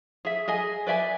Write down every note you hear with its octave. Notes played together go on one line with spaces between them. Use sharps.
G#4 E5
G#4 D#5 G#5
B4 D5 E5 G#5